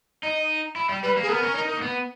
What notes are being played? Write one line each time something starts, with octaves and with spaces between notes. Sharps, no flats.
D#4 D#5
E4
G3
G3 B4
A#3
G#4
B3 A#4
C#4
D#4
D#4
A#3
B3